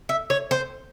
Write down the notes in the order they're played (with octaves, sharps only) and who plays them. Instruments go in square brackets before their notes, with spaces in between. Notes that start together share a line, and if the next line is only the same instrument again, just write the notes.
[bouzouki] E5
C#5
C5